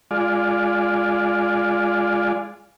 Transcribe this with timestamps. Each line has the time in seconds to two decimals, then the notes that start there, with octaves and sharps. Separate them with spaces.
0.11 G#3 F4 D5